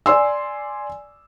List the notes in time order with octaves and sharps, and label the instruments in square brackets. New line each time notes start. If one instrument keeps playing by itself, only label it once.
[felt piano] D5 G#5 C6 E6